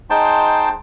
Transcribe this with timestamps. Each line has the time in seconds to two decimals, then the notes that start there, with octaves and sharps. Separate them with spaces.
0.10 G#3 D#4 C5 G5 A5 C6